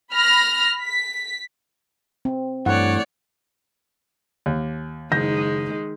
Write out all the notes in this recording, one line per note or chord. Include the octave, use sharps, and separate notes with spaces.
B5 F6 A#6
B6
C4
G2 E3 A3 C#5 D5 F#5
D#2
F#1 D#3 G#3 G6 A#6